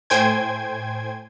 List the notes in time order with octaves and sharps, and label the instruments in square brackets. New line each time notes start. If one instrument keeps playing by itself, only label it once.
[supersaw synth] A2 C5 G5 G#5 G#6